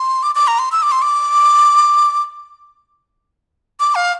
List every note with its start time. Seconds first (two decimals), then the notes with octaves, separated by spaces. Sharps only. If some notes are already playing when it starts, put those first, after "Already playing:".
Already playing: C6
0.23 D6
0.35 D6
0.47 A#5
0.59 C6
0.72 E6
0.82 D6
0.92 C6
1.02 D6
3.80 D6
3.95 F5